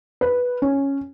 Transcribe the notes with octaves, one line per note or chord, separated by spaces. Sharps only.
B4
C#4